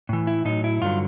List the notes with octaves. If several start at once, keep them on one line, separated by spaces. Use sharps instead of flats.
A2 E3
E4
A2 F#3 D#4
E4
G2 D3 F#3 F4